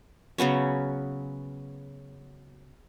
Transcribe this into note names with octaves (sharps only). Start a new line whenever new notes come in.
C#3 F#3 B3 C#4